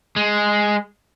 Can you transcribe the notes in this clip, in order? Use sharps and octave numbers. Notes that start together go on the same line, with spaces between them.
G#3